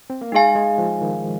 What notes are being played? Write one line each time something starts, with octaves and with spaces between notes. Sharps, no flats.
C4
A#3
G#3 D#4 G#4 F5 G#5
G#3
F3
D#3